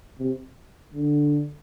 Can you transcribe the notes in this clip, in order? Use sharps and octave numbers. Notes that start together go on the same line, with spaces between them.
C3
D3